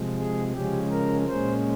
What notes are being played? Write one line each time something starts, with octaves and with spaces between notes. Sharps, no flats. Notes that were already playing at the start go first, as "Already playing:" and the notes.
Already playing: C3 F3 G#3
G#4
C#3 F3 G#3 C#4 G4
A#4
A#2 G#3 C#4 C5